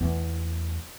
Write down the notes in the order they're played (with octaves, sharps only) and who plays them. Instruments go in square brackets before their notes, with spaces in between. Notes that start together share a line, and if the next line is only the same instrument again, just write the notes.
[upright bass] E2 A3